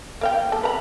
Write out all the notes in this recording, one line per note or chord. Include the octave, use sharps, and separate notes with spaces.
A#3 F5 G5
G3 A4
B4 A#5 B5